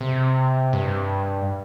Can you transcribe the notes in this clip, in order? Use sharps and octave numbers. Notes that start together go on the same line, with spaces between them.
C3
G2